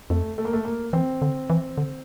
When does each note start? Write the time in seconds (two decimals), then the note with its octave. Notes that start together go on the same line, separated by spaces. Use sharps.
0.10 F2 A3
0.38 A3
0.45 A#3
0.53 A3
0.65 A#3
0.93 E3 C4
1.22 D3
1.50 E3
1.78 D3